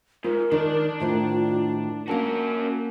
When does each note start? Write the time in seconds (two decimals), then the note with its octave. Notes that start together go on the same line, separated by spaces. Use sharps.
0.24 G#2 F4 A#4
0.52 D#3 D4 D5
1.00 A2 D#3 F4 C5
2.08 A#3 C#4 F#4 A#4 A5